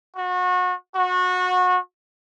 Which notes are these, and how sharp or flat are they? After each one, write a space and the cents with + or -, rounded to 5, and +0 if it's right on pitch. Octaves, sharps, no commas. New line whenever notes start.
F#4 -30
F#4 -25